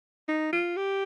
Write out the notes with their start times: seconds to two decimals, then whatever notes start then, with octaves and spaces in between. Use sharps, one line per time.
0.28 D#4
0.52 F4
0.77 G4